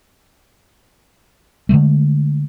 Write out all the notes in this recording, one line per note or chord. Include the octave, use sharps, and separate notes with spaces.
D3 E3 G#3 A3